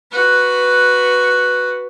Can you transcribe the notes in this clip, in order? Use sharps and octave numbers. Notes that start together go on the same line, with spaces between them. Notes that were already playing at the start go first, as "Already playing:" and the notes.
F#4 B4